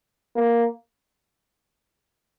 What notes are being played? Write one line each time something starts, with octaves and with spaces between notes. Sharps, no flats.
A#3